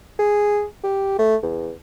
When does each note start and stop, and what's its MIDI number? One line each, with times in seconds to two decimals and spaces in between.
0.19 0.65 68
0.84 1.18 67
1.19 1.36 57
1.42 1.72 40